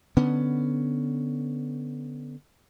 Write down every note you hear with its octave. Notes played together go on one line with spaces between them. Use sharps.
D3 B3 C#4